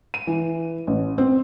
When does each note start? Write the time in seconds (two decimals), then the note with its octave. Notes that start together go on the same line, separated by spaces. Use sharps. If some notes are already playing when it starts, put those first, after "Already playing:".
0.14 D#7
0.27 E3
0.87 A1
1.18 C4